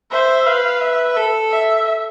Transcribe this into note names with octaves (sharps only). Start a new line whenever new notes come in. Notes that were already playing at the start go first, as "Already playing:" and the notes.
C5 E5
B4 F5
E5
A4
E5